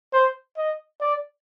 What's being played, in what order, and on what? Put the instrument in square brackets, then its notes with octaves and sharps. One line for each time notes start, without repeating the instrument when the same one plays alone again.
[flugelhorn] C5
D#5
D5